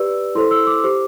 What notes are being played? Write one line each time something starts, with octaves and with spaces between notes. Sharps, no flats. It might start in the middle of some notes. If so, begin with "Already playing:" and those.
Already playing: G4 B4 D5 E6
E4 A4 C5 C6
E6
D6
G4 C5